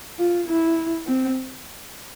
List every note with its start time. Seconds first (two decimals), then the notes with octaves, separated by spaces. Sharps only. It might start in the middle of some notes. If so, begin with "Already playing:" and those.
0.19 F4
0.48 E4
1.07 C4